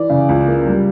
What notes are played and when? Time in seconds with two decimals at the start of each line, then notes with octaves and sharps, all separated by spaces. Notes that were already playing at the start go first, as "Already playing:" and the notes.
Already playing: E3 D5
0.10 C#3
0.29 C#2
0.47 A#3
0.66 G3